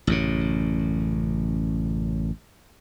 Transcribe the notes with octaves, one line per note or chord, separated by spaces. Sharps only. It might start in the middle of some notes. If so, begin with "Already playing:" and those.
A1 F#2 C#3